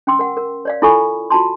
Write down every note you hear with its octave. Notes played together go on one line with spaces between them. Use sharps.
C#4 G5 C6 E6
A#4 F#5
A#4
C#5 D5 F5
E4 F4 A4 G#5 B5 C#6
F4 F#4 A5 C6